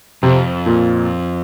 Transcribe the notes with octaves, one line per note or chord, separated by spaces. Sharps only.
F2 C3
A#2